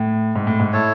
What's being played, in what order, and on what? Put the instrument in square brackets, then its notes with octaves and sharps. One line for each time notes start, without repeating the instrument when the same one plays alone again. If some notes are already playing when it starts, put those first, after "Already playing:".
Already playing: [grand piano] A2
G#2
A2
G#2
[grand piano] A2 [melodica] E4 A4 C#5